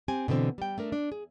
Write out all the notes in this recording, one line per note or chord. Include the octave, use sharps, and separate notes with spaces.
C4 G4 G#5
B2 D3 E3 C4
G3 G5
A3 D4 A#4
D4
G#4